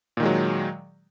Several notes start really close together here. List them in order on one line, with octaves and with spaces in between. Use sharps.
A#2 D#3 G#3 F#3